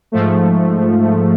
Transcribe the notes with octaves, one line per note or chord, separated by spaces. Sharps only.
G#2 F3 A3